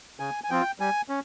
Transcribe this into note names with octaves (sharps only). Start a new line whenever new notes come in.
C#3 G#5
G#5
F3 C4 F4 G5
G3 G#5
C#4